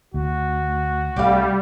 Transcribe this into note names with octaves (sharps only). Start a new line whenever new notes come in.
D2 F#4
C2 G3 A3 G4 F5